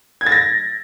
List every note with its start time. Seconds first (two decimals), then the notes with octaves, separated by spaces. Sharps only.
0.21 G#6
0.27 A6
0.32 A#6